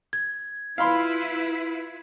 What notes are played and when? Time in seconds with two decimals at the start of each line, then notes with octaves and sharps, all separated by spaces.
0.13 G#6
0.78 E4 F4 B4 F5 B5 C6